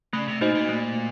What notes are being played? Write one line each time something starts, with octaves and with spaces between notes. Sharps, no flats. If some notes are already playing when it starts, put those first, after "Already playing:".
C#3 A3
C3
A#2 D#4 F#4 C5 D#5
A#2
A3